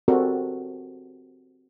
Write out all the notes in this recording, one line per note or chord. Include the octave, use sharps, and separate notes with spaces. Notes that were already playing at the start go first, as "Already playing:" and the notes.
C4 F#4 G4 A4 A#4 D5